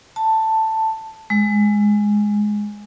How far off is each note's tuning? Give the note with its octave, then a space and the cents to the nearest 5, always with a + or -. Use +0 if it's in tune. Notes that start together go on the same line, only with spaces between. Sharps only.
A5 +5
G#3 +0